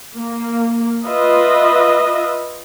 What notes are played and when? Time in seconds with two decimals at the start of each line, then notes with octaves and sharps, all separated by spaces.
0.18 A#3
1.05 F4 B4 D#5 E5